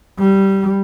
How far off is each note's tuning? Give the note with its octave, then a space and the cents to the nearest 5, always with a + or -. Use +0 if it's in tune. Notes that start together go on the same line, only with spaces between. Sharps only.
G3 -10